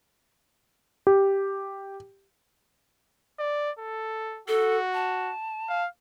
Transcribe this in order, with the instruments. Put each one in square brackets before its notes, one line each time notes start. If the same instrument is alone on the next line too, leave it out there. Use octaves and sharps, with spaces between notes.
[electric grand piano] G4
[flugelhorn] D5
A4
[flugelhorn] F#4 [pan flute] A4
[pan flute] A5
[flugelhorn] F5